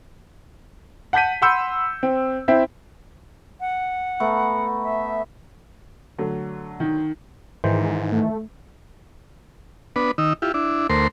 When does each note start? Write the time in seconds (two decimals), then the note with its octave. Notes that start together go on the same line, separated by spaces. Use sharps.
1.13 F#5 A5 G6 B6 D#7
1.42 F#5 B5 C6 E6 G6 C#7
2.03 C4
2.48 C4 E4 E5
3.60 F#5
4.20 A3 B3 A#5
4.83 E5
6.18 D3 F#3 A3
6.80 D#3
7.64 G#2 D#3 E3 C5
8.12 A3
9.96 B3 D4 B4
10.18 D#3 D#4 E6
10.42 E4 F4 G4
10.54 D4 E4
10.90 D2 A3 A#4 C5 C6